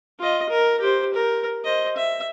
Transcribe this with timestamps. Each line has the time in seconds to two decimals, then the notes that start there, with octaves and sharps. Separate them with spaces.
0.19 F4 D#5
0.49 A#4
0.80 G4 C5
1.14 A#4
1.64 C5 D#5
1.96 E5